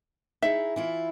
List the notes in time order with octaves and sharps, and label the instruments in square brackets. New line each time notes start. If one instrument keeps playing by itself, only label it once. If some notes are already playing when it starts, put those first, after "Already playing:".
[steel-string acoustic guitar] D#4 E4 G#4 [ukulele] E5
[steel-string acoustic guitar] E3 E4 F4